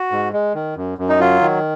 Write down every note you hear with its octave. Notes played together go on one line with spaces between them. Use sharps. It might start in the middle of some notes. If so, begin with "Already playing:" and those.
Already playing: F#4
G#2
G#3
D#3
F#2
F#2
D#4
F#3 F4
D#3